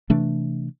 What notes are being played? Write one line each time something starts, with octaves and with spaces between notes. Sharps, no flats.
C3 E3 A3 D4